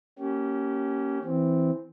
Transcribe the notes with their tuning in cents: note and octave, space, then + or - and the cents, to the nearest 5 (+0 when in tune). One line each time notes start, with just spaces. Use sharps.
A#3 +0 C#4 +0 G4 -30
E3 -5 C4 -5